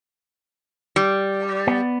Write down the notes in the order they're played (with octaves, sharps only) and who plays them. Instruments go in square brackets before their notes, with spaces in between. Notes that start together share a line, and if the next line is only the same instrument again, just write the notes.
[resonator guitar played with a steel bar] G3
[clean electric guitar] B3